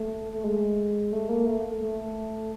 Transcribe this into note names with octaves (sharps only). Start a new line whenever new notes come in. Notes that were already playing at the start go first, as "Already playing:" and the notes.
Already playing: A3
A3
G#3
A3
A#3
A3
A3